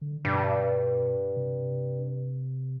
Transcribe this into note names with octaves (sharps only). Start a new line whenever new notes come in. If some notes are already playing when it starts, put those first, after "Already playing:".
D3
G2 B2
C3